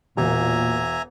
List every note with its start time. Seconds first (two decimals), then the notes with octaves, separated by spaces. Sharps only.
0.17 E1 A#2 E5 G#5 A#5